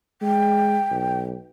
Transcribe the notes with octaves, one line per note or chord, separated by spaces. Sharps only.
G#3 G5
B1